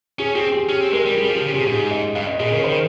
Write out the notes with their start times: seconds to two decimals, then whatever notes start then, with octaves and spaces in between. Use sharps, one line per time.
0.19 C#4 G#4
0.35 C4 G#4
0.52 G4
0.69 C#4
0.81 C4
0.93 G#3 A#4
1.06 G3
1.17 G3 G#4
1.30 F3 G4
1.42 C#3
1.54 C3 G#4
1.66 G#2 G#4
1.91 D#5
2.15 G2 F5
2.27 D#5
2.40 A#2 G#4
2.52 C#3 A#4
2.64 D#3 C5